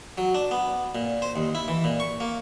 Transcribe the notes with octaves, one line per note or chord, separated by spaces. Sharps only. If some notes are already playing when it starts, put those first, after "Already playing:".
F#3
D4
B3
A#2
C5
D#2
E4
E3
A#2
C#6
A#3